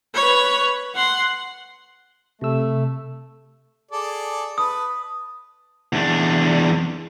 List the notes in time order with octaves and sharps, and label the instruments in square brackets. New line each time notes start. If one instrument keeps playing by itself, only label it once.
[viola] B4 C#5
F#5 C6
[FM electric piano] C3 E6 [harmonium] A3
[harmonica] G#4 A4 D5
[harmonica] B4 A5 [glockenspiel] D#6
[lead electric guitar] E2 D4